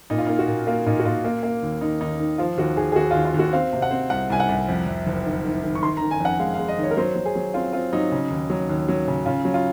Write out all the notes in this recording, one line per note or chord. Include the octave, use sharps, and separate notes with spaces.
A#2 D#4
F4
A#3 D#4
F#4
A#2
A#3 F4
A#2 D#4
F#4
A#2 F4
A#3
A#3
D#2
D#3 D#4
D#2 D#4
D#3
F3 F4
D#2 F#4
D#2 G#4
G#4
D#2 F#4
F4
D#2
F4
D#2
F#4
C4 F5
C3
F#5
C4
C2 F#5
C2 G#5
F#5
C2
F2
F2
F#1
D#3
D#3
D#3
C#6
D#3 C6
A#5
D#3
G#5
F2 F#5
G#3 F5
F5
G#3
D#5
D#3
C#5
A#4
F#3 C5
F#3
G#4
F#3
C4 F4
C4 F4
F#3 D#4
C#3
D#2
F#3
D#2
F#3
C#3
C#3 F4
F#3
F4